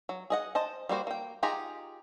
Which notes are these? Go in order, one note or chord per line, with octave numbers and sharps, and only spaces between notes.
F#3
G#4 D#5 F#5
C5 D#5 A5
G3 A#3 F#4 C5
A#3 G5
D#4 F4 G4 G#4 A#5